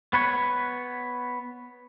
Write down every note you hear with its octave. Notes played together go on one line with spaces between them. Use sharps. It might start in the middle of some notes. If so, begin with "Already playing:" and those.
B3 B4 C#5